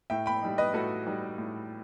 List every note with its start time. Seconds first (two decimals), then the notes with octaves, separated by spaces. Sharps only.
0.10 A2 E5 G5
0.26 G5 B5
0.42 G3 D#4
0.58 B4 D#5
0.74 A2 F#4 A4
1.06 G3 D#4
1.38 A2